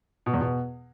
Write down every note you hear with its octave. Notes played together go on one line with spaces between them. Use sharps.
B2
E2
B2